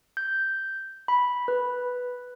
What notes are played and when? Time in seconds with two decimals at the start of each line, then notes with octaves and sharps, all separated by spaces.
0.17 G6
1.08 B5
1.48 B4